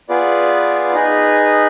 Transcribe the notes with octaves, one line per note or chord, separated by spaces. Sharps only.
B3 F4 G#4 B4 D5
D#4 G#4 B4